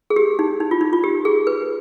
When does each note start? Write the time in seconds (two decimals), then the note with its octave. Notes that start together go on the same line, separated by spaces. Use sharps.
0.10 G#4
0.16 G4
0.39 D#4
0.60 D#4
0.71 F4
0.81 D#4
0.93 F4
1.04 G4
1.25 G#4
1.47 B4